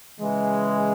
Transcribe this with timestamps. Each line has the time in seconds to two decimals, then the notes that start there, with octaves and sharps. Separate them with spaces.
0.20 C#3 E3 G#3